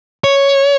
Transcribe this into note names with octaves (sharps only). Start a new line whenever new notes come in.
C#5